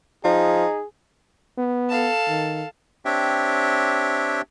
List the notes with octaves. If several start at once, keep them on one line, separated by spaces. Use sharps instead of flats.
F3 D#4 G#4
B3
A4 F5 A5
D#3
C4 D4 G4 C#5 E5 G5